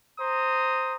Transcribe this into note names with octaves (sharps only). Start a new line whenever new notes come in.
C5 A#5 D#6